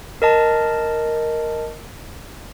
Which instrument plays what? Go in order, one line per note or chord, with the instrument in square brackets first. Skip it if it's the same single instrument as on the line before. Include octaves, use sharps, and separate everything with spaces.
[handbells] A#4 D#5 A5